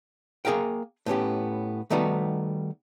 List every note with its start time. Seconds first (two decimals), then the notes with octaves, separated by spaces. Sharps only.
0.45 A#3 G#4 A#4 F5 G5
1.06 A2 B3 C#4 G4
1.90 D#3 G3 A3 B3 D#4 F#4